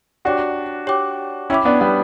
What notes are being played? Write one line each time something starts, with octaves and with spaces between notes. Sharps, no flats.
D4 F#4 G4 C#5 G5 D6
G4 C#5 G5 D6
C#4 E4 C#5 G5 B5 D6
B3 D4
G3 B3